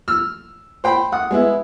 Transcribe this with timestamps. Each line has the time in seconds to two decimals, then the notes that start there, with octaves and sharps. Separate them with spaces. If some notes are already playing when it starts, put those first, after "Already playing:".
0.08 E6 F6
0.84 C5 G5 B5
1.12 F#5 D#6
1.31 G#3 B3 E4